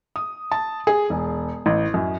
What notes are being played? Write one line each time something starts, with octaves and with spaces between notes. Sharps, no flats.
D#6
A5
G#4
E1
A1
F#2